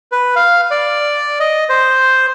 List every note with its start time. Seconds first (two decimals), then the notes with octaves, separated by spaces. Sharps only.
0.12 B4
0.36 F5
0.71 D5
1.40 D#5
1.69 C5